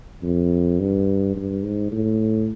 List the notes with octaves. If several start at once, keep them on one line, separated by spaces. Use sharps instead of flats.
F2
G2
G2
G#2
A2